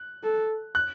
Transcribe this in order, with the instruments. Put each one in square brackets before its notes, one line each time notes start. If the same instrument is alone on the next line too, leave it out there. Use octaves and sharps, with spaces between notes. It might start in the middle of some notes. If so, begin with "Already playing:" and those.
Already playing: [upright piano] F#6
[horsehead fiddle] A4
[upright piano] F#6